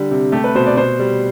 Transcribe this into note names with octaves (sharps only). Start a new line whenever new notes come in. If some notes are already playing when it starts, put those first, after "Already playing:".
Already playing: D3 G3
C3
A3 G4
B4
B2 C5
D5
B2 C5
G3